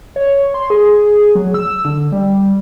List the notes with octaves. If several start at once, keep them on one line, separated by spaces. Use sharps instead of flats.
C#5
C6
G#4
F#3
E6
D3
G3